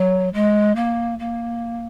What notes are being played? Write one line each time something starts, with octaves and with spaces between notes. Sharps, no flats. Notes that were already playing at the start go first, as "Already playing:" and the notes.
Already playing: F#3
G#3
A#3
A#3